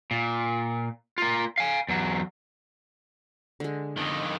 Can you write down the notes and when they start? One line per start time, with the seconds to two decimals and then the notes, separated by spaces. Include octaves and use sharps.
0.11 A#2
1.18 A#3 F4
1.58 F5 G#5
1.89 E2 F#3
3.60 D3 G#3
3.97 F2 D#3